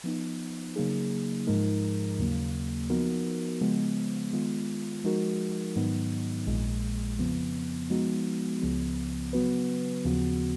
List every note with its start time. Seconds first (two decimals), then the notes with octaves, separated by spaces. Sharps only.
0.04 F3 B3 D#4
0.76 C#3 F#3 A#3 D#4 G#4
1.47 G#2 F3 G#3 D#4 A#4
2.19 D#2 C#3 F#3 A#3
2.90 F3 B3 D#4 F#4 A#4
3.61 C#3 F3 G#3 B3
4.33 D#3 G#3 B3 F4
5.04 F3 G#3 D#4 F#4 A#4
5.76 G#2 D#3 F#3 B3 D#4
6.47 A#1 A#2 G#3
7.18 F2 C#3 F3 B3
7.90 F3 G#3 B3 D#4 F#4
8.61 C#2 C#3 F3 B3
9.33 C#3 F#3 B3 F#4 B4
10.04 D#2 C#3 F3 B3 F#4